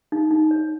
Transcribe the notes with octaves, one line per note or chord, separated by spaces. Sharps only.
D#4
D#4
C#5